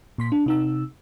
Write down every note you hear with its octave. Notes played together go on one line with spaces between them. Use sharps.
A#2 C6 B6
D4
C3 D#4 E6